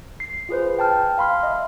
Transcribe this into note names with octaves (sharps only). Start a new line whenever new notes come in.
C7
F4 G#4 B4 C5
G5 A5 F6
F5 B5 C6 F6
D#5 E5